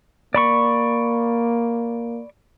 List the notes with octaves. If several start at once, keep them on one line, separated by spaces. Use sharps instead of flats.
A#3 D5 B5 C#6